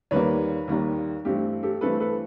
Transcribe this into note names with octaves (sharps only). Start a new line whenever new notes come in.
D#2 D#3 G3 A#3 B4 C#5
D#2 D#3 G3 A#3
G2 E3 A3 C4 G4
G4 A4
G2 E3 A3 C4 A4 B4
A4 B4